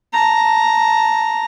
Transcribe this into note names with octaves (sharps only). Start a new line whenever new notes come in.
A5 A#5